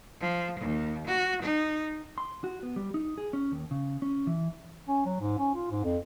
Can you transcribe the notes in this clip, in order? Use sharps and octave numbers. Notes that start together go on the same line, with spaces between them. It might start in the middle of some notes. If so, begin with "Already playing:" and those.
F3
D#2
F#4
D#4
C6
F#4
B3
G3
D#4
G#4
C#4
D#2
C#3
C#4
E3
C#4
F#3
G#2
C#4
F4
G#2
F2